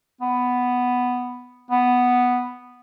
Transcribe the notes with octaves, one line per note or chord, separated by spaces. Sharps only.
B3
B3